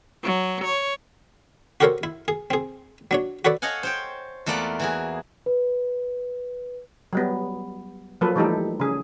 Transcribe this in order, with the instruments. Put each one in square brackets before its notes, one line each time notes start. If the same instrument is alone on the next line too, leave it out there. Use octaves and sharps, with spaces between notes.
[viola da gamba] F#3
C#5
[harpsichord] F#4 G4 A4 A#4 C5 C#5
E4
G#4
C4 G#4
F#3 D4 C#5
F#4 A4 B4 C#5 D5
[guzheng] A4 C#5 D#5 F5 F#5 G#5
C5 C#5 G5
E2 A3 A#3 F4 D5 F#5
E3 F#4 G#4
[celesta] B4
[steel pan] F#3 G3 B3
F3 F#3 A#3 A4 B4
E3 G3 A3 D#4 G4 A4
C#3 G#4